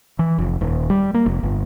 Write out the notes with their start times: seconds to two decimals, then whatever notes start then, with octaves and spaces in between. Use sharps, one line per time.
0.19 E3
0.38 F1
0.61 D#1
0.90 G3
1.14 A#3
1.26 F1
1.43 G1